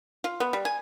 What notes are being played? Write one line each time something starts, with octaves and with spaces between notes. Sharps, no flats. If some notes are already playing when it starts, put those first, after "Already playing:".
F4
B3
G3
G#5